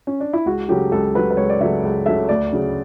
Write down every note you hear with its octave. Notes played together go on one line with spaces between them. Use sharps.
C#4
D4
E4
C#2 F#4
C#3 F#3 A3 G4
C#2 A4
C#3 F#3 A3 B4
B4
C#2 C#5
D5
C#3 F#3 A3 E5
C#2
C#3 F#3 A3 E5
D2 D5
C#3 F#3